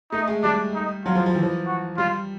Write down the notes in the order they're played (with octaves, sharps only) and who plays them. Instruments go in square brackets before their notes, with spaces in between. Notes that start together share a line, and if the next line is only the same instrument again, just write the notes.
[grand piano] A3 [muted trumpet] D#4
[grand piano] G#3
[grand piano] G3 [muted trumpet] D4
[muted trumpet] D#4
[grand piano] F#3 [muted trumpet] F4
[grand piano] F3
F3
E3
F3
[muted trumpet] F#4
[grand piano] G3 [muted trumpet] F4